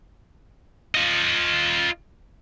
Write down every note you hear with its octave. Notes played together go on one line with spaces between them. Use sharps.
F4 D#5